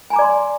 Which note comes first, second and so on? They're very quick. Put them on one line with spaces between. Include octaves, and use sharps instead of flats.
G#5 A#5 D6 D5 C6